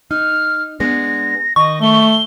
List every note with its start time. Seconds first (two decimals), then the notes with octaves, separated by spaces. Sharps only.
0.11 D#4 F6
0.80 G#3 B3 D4 A#6
1.56 D#3 D#5 C#6
1.82 A3 G7